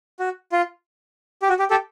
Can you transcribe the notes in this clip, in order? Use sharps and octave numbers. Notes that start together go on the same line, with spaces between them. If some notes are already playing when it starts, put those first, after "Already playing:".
F#4
F4
G4
F#4
G4
G4 A4